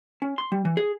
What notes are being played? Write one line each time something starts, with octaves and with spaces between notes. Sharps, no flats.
C#4
C6
G3
E3
G#4